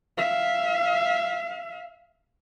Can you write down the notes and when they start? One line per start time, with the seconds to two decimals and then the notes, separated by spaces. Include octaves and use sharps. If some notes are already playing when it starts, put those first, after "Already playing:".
0.17 E5 F5